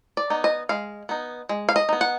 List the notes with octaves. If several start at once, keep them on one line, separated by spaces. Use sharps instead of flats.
D5
B3 D#4
D#5
G#3 F5
B3 D#4
G#3
F5
D#5
B3 D#4
F#5